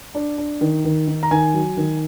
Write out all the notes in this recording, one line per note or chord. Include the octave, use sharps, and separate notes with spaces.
D4
D4
D#3
D#3
D#3
A#5
D#3 G#5
F#3
D#3